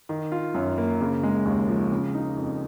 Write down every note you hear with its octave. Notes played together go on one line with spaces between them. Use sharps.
D#3
F4
F#2
A#3
C#3
G#3
D#2
F3
C#3
D#4
F2